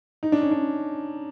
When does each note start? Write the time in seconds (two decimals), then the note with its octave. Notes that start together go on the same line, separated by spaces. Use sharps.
0.23 D#4
0.32 D4
0.42 C#4
0.51 D4